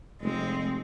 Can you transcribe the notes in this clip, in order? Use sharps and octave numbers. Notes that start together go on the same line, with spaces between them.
F1 G#3 C4